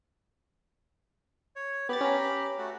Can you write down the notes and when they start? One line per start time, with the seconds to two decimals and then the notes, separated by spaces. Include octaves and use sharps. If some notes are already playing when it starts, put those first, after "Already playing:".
1.56 C#5
1.89 B3 G4 B5 A6
2.01 C#4 A#5
2.58 A3 F#4